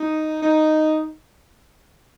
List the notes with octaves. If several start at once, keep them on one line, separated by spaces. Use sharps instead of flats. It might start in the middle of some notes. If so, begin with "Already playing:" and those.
Already playing: D#4
D#4